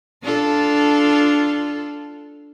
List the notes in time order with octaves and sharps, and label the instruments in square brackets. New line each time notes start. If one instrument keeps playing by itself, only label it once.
[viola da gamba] D4 F4 A4